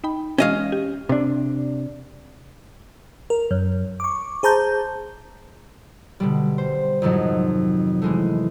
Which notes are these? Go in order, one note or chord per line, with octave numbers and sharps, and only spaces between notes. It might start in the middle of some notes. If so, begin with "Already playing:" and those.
D#4 G5 B5
E3 G#3 C#4 D#5 F5
G4
C3 D4
A#4
F#2
C#6 D6
G#4 C5 A5 A#5 G6
B2 D3 G3
C5
F2 G#2 C3 D#3 F#3 D#4
E3 G#3 A3